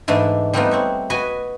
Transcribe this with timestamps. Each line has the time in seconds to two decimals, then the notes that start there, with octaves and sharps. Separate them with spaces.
0.08 G#2 E3 A3 D4
0.53 G3 A3 B3 C4 D#4 F4
0.71 C4 C#5 E5
1.10 F#4 B4 D#5 G#5